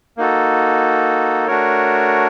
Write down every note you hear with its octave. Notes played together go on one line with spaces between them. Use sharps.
A#3 D#4 F#4 A4
A3 D4 F#4 A#4 C#5